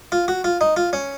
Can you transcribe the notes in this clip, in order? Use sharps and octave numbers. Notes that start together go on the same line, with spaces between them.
F4
F#4
F4
D#4
F4
C#4